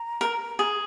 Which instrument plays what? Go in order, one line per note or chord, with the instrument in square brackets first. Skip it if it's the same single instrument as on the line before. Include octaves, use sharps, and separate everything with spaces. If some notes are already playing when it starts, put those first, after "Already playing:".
Already playing: [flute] A#5
[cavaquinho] A#4
G#4